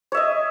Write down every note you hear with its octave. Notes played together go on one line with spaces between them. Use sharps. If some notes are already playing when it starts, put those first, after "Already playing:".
C#5 D#5 E5